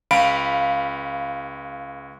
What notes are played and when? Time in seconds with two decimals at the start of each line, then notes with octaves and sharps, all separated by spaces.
0.11 C#2 F5 B5 D7